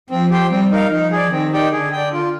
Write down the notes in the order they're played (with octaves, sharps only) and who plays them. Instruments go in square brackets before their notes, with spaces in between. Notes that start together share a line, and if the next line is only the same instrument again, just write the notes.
[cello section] F3 [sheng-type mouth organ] C4
[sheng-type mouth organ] G4 C5 G5
[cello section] G3 [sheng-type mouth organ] C4
[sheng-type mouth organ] D#4 A#4 F5
[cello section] F3 [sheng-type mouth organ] D#4
[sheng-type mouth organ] G#4 D5
[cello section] D#3 [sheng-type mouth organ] C4
[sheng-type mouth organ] D#4 G4 D5 G5
[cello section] D3 [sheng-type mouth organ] G#4
[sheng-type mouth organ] D5 G5
F4